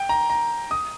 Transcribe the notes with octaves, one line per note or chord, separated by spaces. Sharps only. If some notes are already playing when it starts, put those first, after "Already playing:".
Already playing: G5
A#5
A#5
D#6